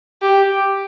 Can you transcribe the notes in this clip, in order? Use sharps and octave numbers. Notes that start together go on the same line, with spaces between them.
G4